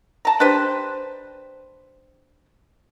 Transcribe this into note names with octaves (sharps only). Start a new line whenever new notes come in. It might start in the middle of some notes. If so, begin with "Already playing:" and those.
A5 A#5
D4 G4 B4 C5